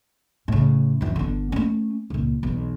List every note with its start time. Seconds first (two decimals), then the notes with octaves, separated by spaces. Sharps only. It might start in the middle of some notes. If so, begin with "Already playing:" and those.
0.48 A2 C#3
1.01 F#2 E3
1.16 G1 D3
1.52 A3 C#4
2.10 C#2 A#2
2.43 B1 E2